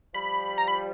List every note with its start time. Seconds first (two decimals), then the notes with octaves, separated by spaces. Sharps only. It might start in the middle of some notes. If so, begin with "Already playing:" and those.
0.13 F3 G3 B5
0.58 A#5
0.68 B5